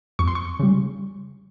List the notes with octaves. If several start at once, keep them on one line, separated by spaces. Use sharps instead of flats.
F2 C#6
C6
C#6
C#3 G3